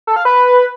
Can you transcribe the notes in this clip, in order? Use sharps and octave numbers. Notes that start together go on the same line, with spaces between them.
A4
F5
B4